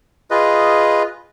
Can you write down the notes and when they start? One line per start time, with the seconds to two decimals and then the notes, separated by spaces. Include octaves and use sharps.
0.31 F4 G#4 B4 D#5